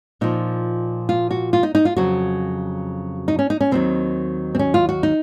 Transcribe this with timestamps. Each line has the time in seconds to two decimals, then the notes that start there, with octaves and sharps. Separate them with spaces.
0.21 A#2 F3 D#4
1.09 F4
1.31 F#4
1.53 F4
1.63 D#4
1.75 D#4
1.85 F4
1.96 F2 C#3 F#3 F#4
3.28 D#4
3.39 C#4
3.50 D#4
3.61 C#4
3.71 D#2 D#3 F#3 C4
4.55 C4
4.59 C#4
4.74 F4
4.89 F#4
5.03 D#4